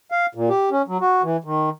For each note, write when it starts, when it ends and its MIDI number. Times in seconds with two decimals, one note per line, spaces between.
0.12 0.26 77
0.35 0.49 46
0.49 0.69 67
0.71 0.82 61
0.88 0.98 54
1.01 1.22 66
1.23 1.37 52
1.44 1.70 51